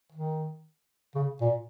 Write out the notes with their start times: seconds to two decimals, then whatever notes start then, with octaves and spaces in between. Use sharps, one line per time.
0.13 D#3
1.15 C#3
1.41 A#2